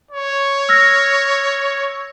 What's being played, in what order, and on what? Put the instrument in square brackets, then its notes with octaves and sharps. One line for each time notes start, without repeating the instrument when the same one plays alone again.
[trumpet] C#5
[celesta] E6 F6 A#6